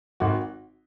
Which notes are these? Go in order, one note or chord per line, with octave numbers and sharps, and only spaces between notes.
G#1 F#4